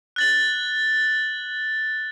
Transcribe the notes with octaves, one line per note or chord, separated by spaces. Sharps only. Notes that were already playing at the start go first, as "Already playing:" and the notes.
F#6 A6 F#7